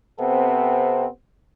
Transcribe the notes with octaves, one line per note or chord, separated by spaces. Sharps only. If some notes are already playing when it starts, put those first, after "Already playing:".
C3 B3 C4 A4